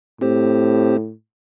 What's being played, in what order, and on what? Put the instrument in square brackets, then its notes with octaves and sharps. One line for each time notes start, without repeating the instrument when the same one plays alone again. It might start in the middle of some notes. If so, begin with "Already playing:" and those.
[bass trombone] A2 [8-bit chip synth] C4 G4 C5